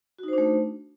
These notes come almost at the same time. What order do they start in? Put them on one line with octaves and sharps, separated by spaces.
F#4 D#4 C5 D4 A3